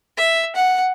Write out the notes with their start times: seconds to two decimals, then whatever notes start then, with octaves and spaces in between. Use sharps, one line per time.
0.17 E5
0.55 F#5